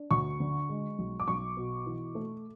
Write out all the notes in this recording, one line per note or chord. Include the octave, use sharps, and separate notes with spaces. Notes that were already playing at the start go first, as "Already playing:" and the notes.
Already playing: D4
D2 C#6
D3
G#3
B1
D6
B1 C#6
B2
E3
A3